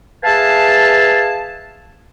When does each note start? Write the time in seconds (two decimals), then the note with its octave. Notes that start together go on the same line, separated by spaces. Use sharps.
0.24 G#4 B4 E5 F5 G#5 A5